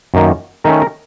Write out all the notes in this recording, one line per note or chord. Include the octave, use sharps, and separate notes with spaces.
F#2 D#3 A#3
D#3 A3 C#4 A#4
A#4